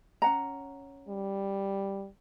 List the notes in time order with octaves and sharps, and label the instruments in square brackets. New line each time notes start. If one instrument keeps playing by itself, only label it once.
[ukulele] C#4 F#5 A#5
[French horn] G3